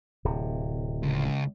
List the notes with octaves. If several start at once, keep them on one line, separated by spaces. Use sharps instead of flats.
D1 C3
C#2